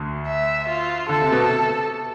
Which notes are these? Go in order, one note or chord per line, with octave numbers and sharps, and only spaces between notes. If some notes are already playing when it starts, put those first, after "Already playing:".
Already playing: D2 D3
E5
F4
D3 A4
C3
B2
C3